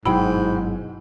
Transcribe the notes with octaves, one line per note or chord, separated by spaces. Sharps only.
G1 G#2 B2 F#3 E4 G#4 G5 B5